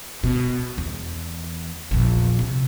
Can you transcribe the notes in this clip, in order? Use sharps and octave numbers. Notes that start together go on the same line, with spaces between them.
B2
E2
A#1 E2
C3